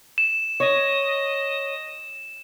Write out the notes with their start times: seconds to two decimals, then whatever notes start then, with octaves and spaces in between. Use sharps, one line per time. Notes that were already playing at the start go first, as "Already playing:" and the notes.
0.18 E7
0.60 C#5 D#5